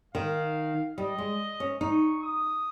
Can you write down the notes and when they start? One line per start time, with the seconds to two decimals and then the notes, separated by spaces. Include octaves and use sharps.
0.15 D#3 F5
0.98 G3 D#5
1.18 G#3
1.60 C#4
1.81 D#4 C#6
2.22 D#6